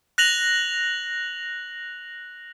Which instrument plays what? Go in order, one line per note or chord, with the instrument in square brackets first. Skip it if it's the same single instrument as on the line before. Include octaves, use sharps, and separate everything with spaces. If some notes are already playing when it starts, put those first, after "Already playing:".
[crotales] F#6 A#6 F7 F#7